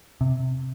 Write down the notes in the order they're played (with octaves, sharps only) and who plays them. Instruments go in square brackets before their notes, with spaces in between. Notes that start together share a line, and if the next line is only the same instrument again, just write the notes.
[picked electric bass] C3